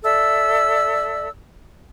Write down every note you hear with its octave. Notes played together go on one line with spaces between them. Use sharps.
A4 D5 E5 E6